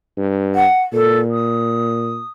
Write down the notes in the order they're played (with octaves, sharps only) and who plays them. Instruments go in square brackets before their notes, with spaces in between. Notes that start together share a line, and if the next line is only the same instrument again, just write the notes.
[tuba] G2
[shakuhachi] F#5
[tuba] A#2 [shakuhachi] A4
[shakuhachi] D#6